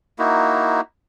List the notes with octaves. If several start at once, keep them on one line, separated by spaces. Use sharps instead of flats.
A#3 D#4 E4 F#4